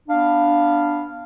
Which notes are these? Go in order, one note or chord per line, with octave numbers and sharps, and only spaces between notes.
B3 D4 F5